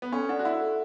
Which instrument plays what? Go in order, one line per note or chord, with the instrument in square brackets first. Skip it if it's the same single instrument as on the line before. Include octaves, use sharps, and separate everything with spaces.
[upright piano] B3
[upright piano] C#4 [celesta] A4
[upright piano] D4 [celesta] F#5
[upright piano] F#4
[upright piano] E4 [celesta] F#5
[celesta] A4